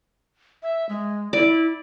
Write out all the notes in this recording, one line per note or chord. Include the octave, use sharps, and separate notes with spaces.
E5
G#3
E4 D5